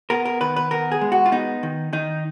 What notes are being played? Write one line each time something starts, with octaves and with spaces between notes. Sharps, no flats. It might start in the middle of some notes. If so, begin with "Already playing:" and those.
B3 A#4
A#4
D#3 B4
B4
B3 A#4
G#4
G#3
F#4
F4
B3 D#4
D#3
D#3 D#4